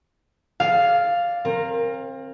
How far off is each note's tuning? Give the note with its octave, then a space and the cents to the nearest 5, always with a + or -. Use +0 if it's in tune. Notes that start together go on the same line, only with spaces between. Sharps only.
G#4 +40 D5 +0 F5 +0
C4 +30 A#4 -5